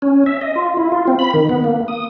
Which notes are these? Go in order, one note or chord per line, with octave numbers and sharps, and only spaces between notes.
C#4
E5
D#5
F4
E4
F4
C4
B5
D#3
B3
A#3
D#6